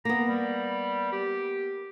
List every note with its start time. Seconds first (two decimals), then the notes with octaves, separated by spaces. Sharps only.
0.05 A#3 B3 A#5
0.26 G3
1.12 G4